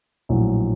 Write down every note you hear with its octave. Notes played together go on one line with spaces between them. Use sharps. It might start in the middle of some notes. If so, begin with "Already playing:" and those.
A#1 A2 F#3